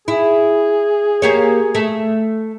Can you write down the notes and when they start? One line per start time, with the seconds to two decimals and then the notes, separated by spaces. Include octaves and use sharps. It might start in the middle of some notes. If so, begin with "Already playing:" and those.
0.08 E4 G#4
1.22 A#3 G4 C#5
1.75 A3